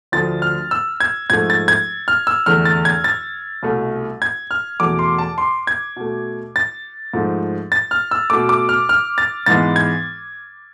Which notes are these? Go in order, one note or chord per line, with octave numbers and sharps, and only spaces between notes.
D2 D3 F3 A3 A6
F6
E6
G#6
G#2 F3 A3 G#6
A6
G#6
F6
E6
E2 D3 A3 F6
A6
G#6
A6
C2 B2 A3
G#6
F6
E2 B2 A3 D6
C6
A5
C6
G#6
B2 A3
A6
G#2 F3 A3
A6
F6
E6
B2 A3 D6
D6
F6
F6
A6
G#2 E3 G#3 B3 A6
G#6